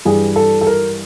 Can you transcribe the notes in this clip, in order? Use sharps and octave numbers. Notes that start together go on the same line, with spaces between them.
G2 E3 G3 G#4
A4
A4
A#4